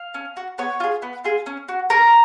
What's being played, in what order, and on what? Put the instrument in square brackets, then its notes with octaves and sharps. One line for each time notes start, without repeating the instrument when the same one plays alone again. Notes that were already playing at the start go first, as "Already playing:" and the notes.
Already playing: [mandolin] F5
C#4
F#4
B3 C#5
F4 G#4
B3
F4 G#4
C#4
F#4
C#4 A#4